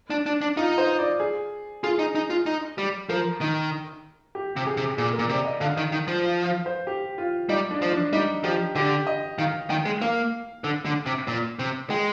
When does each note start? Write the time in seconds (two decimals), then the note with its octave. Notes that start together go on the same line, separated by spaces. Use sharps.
0.10 D4
0.26 D4
0.41 D4
0.57 D#4 F4
0.78 C5
0.99 D5
1.20 G#4
1.83 F4 G#4
1.99 D#4
2.15 D#4
2.30 F4
2.46 D#4
2.78 G3
3.09 F3 A#4
3.41 D#3
4.35 G4
4.56 C3
4.66 G#4
4.77 C3
4.98 A#2 G#4
5.13 A#4
5.19 A#2
5.29 C3 D5
5.45 D#5
5.60 D3 F5
5.77 D#3
5.92 D#3
6.08 F3
6.24 F5
6.45 F5
6.66 C5
6.87 G4
7.18 F4
7.49 G3 D#4
7.71 D4
7.82 F3
7.92 D4
8.13 G3 D#4
8.44 F3 G4
8.75 D3 G4
9.07 D#5
9.38 D#3 F5
9.70 D#3 G5
9.85 G#3
10.02 A#3 F5
10.64 D3
10.85 D3
11.06 C3
11.27 A#2
11.59 C3
11.90 G#3 G5